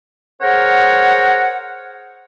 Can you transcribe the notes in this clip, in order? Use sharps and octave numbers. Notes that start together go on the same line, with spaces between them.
G#4 A#4 C5 C#5 F#5